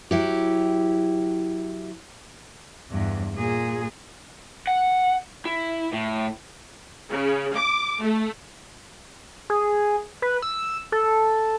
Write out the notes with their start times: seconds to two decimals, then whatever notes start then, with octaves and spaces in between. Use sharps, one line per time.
0.11 F#3 E4 G4
2.90 E2 G2
3.35 A#2 G#4
4.67 F#5
5.45 E4
5.93 A2
7.10 C#3
7.55 D6
8.01 A3
9.50 G#4
10.22 B4
10.42 E6
10.92 A4